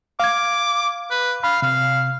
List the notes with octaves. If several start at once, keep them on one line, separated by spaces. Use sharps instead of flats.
F5 D6 G#6
B4
F5 B5
C3 F5